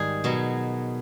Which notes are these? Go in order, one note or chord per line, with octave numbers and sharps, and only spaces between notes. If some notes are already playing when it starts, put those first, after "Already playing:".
Already playing: G#2 D#3 G3 G#4
B2 F#3